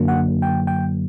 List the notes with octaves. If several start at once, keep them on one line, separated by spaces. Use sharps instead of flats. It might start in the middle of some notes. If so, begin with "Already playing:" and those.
Already playing: F#2 D3 F#3 A#3
F#5
G5
G5